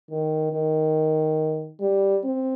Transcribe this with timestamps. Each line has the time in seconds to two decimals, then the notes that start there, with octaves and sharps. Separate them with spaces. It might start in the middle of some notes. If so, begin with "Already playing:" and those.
0.11 D#3
0.53 D#3
1.81 G3
2.24 C4